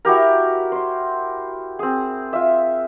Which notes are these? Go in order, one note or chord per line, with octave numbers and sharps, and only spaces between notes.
E4 F#4 G4 A#4
C5 C6
C4 G#4
F4 E5